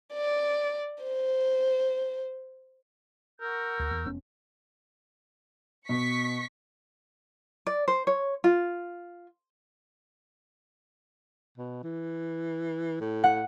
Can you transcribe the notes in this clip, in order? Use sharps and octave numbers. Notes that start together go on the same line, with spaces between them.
D5
C5
F#4 A#4 E6 G6
D2
E2
F1 B3 C#4
B2 C#6 B6 C#7
D5
C5
C#5
F4
B2
E3
A2
F#5